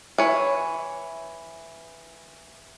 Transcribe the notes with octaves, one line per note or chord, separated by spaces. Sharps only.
E3 C#5